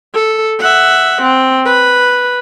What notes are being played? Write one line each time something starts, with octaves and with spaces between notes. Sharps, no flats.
A4
E5 F#5
C4
B4